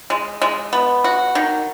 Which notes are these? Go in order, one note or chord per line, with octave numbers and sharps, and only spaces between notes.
G#3
G#3
B3
F#4
D#3